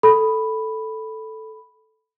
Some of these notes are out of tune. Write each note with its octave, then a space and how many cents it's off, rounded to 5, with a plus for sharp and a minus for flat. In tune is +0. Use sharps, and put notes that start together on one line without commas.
A4 +0 B5 +0